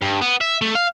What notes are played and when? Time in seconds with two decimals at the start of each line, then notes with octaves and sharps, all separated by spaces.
0.02 G2
0.22 B3
0.41 E5
0.62 A3
0.75 F5